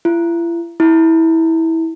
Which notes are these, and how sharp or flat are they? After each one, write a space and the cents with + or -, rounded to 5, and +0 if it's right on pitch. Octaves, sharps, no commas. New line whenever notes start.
E4 +40
E4 -20